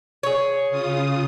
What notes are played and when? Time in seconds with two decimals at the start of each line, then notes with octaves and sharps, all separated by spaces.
0.23 G#4 C#5
0.69 C#3 F4 D#6